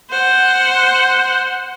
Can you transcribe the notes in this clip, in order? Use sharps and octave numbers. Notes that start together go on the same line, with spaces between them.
C5 F#5